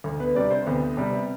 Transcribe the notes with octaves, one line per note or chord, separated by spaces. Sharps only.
D2
B3 B4
C3 G3 D4 D5
C4 C5
D2 B3 B4
C3 G3